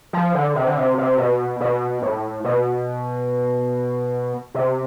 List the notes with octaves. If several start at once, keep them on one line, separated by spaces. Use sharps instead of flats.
F3
D3
C3
D3
C3
C3
B2
B2
A2
B2
C3